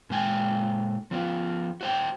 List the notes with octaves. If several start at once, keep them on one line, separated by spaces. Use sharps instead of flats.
A#2 G#3 G5 G#5
F3 B3 F4
F#4 C5 G5